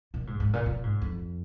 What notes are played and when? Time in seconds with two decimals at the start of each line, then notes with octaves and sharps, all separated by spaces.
0.14 A#2
0.27 G#2
0.40 G#2
0.53 A#2
0.66 A#2
0.83 G#2
1.02 F2